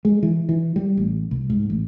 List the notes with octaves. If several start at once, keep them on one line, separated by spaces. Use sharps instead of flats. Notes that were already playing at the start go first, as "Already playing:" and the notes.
G#3
E3
E3
G3
A1
C2
G#2
A1